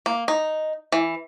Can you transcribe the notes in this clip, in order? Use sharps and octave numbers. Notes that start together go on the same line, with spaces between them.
A#3
D#4
E3